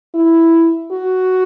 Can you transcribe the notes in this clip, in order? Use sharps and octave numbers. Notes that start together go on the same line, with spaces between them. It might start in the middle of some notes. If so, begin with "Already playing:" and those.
E4
F#4